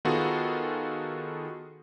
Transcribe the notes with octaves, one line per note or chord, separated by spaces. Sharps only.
D#3 B3 F4 F#4 G#4 A4